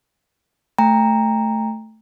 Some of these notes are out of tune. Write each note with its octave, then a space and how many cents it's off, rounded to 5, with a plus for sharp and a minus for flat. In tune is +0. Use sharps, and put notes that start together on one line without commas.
A3 +0 G5 +30 A#5 -5